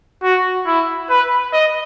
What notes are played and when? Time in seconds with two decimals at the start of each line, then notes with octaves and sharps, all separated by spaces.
0.23 F#4
0.67 E4
1.10 B4
1.53 D#5